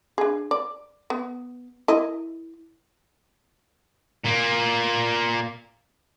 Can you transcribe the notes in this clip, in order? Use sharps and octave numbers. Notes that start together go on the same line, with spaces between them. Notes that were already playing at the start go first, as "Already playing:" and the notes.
D4 G#4
D5
B3
E4 A#4 D#5
A#2 A#3